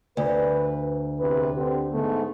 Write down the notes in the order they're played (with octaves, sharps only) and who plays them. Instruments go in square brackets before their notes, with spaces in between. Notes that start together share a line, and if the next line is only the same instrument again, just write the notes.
[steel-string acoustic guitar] D2 [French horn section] B4
[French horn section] E2 C3 B4
D3 C4 G4
G#2 A3 B3